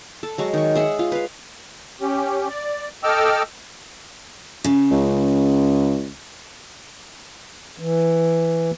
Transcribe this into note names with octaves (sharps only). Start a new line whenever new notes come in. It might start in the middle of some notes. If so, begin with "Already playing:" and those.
A4
F#3 G#3 C#6
D#3 C#6
G#4 E5 F#5
F4
B4 F5
C#4 G4
D5
A4 D#5 G5 D6 E6 F6
C#3
C#2
E3